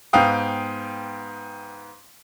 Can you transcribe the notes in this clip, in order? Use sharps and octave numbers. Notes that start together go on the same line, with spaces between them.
G#2 B3 F5 G5 D#6